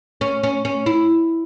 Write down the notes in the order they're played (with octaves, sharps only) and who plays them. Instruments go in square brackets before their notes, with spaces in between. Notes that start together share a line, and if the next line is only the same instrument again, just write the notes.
[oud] C#4
C#4
C#4
E4